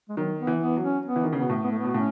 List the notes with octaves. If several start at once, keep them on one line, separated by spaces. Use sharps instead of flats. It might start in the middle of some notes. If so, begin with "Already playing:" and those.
G#3
D#3 F#3
B3
E3
B3
F#3
C#4
B3
E3
D#3
C#3 B3
B2
A2
B3
A3
B3
B2
A2 C#4